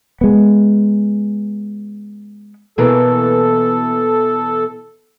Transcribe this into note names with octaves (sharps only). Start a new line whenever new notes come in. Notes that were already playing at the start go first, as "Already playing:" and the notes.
G#3 B3
B2 E3 A#3 A4